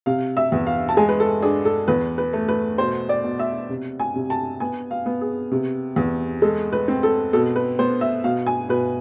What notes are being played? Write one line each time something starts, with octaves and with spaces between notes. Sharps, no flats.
C3 F5
E5
E2
F5
A5
G#3 G#5
B4
A4
D4 G#4
A4
E2 B4
B4
A3
B4
B2 C5
D5
B2
E5
C3
G#5
C3
A5
B3 G#5
F5
B3
G#4
C3
E2
G#3 A4
B4
C4
A4
B2 A4
B4
B3 C5
E5
B2 F5
G#5
B2 B4